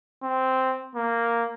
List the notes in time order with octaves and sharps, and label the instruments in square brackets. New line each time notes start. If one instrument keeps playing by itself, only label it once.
[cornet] C4
A#3